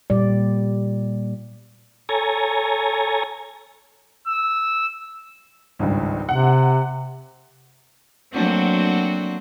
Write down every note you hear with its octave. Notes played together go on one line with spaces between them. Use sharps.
A#2 G3 D5
A4 C#5 G#5 A#5
E6
G#1 C#2 G2
C3 F#5
F#3 A3 A#3 C4 D4 F#4